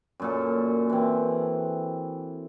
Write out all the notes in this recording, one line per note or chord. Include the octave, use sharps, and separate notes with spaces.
F#2 A#2 A4
E3 C4